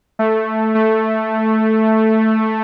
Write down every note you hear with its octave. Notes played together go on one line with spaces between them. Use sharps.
A3
A3